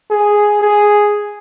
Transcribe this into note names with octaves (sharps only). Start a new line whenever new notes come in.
G#4
G#4